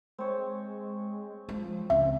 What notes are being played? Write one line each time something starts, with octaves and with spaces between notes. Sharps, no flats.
G#3 C4 C#5
F3 G#3
C#2 C4 E5